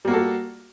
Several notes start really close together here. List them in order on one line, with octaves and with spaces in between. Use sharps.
G3 A#3 F#4 A4